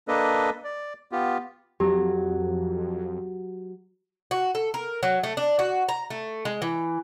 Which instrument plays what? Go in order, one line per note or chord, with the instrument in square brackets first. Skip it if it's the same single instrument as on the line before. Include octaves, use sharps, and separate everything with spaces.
[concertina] A#3 D4 A4 B4 D#5
D5
B3 F4 G4
[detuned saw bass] F2 [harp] F#3 [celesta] G4
[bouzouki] F#4
A4
A#4
F#3
A3
D4
F#4
A#5
A3
G#3
E3